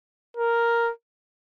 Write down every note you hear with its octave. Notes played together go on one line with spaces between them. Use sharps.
A#4